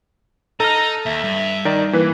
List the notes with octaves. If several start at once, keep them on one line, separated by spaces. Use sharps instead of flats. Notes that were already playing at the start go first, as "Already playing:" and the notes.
D#4 A4 A#5 F6
D#2 E5
G2
D#3 D5 A#5
E3 A#3 B4